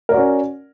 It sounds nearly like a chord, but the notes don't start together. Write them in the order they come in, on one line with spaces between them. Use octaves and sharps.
A#4 D5 F#4 C#4